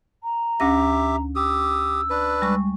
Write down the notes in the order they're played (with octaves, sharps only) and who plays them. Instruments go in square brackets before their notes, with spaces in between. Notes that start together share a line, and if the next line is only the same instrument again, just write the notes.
[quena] A#5
[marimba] D2 C#4 A#6 [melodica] G4 E5
[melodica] G4 D#6 [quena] E6
[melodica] D4 B4
[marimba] G3 G#3 C#6